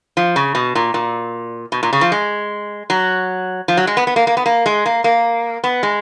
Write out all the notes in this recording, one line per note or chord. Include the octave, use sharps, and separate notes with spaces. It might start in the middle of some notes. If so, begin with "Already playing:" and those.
F3
C#3
B2
A#2
A#2
B2
A#2
C#3
F3
G#3
F#3
F3
F#3
G#3
B3
B3
A#3
A#3
B3
A#3
G#3
A#3
A#3
B3
G#3